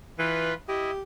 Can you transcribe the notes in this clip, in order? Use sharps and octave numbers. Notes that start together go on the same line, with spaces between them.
E3 F4 B4
E4 G4 D#5